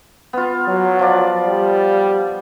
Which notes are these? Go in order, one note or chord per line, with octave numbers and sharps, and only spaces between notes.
B3 F4
F#3
F3 D5
G3